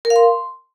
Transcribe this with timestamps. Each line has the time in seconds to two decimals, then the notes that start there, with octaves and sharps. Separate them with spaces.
0.05 A#4
0.10 F5
0.16 C6